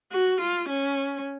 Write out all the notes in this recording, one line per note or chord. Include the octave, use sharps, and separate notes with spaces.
F#4
F4
C#4